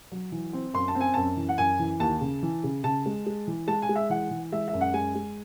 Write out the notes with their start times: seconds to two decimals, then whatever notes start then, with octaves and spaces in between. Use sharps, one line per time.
0.12 F#3
0.32 E3
0.53 C4
0.74 F#2 C6
0.88 A5
0.95 C4
1.01 G#5
1.14 F#2 A5
1.37 E3
1.49 F#5
1.58 F#2 G#5
1.79 E3
2.00 D#2 A5
2.21 C#3
2.42 E3
2.64 C#3
2.84 C#3 A5
3.06 G#3
3.26 G#3
3.47 E3
3.67 G#3 A5
3.82 G#5
3.89 G#3
3.96 E5
4.10 E3 F#5
4.31 E3
4.52 G#3 E5
4.68 E5
4.73 F#2
4.81 F#5
4.94 G#3 G#5
5.15 G#3